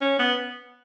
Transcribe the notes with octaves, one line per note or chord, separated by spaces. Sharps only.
C#4
B3